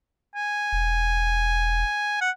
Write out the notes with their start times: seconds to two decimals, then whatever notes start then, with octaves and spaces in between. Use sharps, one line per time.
0.35 G#5
0.72 E1
2.21 F#5